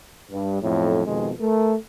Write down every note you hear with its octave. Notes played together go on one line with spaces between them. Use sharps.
G2
B1 F2 A2
F2 B2 D#3 G#3
A3 A#4